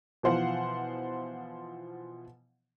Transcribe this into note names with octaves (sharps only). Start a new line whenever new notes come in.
B2 E3 F3 C5 F5 F#5